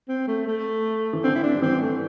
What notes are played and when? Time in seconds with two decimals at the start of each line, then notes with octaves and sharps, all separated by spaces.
0.08 C4
0.28 A3
0.47 A3
1.13 E3
1.24 D3 C4
1.35 E4
1.43 D4
1.55 G3
1.62 E3 C4
1.82 A3